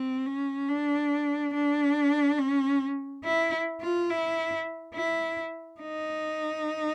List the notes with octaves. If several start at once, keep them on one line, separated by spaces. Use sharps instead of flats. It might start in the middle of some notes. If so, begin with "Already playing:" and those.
Already playing: C4
C#4
D4
D4
C#4
E4
F4
E4
E4
D#4